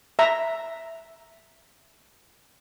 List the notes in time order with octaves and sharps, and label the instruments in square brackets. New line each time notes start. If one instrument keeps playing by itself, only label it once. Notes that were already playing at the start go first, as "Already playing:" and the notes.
[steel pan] E5 A#5